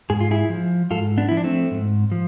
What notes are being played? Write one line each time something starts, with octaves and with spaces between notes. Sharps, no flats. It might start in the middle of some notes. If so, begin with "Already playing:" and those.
G#2 G#4
F4
E4 G#4
F3
G#2 F4 A4
B3 D4
F3 E4
D4
A3 C4
G#2
F3